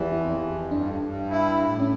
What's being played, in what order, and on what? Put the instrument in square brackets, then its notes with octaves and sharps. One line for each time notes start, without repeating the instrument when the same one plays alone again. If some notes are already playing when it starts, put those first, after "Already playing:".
Already playing: [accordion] E2 E3 [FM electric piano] G4 F5
[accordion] F2 [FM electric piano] E4
[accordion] F2
[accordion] G2 [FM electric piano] D4
[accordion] G2
E4
A2
[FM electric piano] C#4